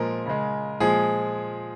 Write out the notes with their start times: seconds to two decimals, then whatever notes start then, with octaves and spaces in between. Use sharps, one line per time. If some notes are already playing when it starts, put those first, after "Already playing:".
Already playing: A#2 F3 G#3 A#4
0.26 C#3 G#3
0.80 A#2 F3 G#3 G#4